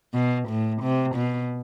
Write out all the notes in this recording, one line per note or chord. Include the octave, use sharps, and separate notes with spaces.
B2
A2
C3
B2